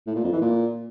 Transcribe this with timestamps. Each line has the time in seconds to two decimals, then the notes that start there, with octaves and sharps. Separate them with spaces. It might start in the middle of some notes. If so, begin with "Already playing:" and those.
0.07 A2
0.15 A#2
0.24 F2
0.33 E3
0.42 A#2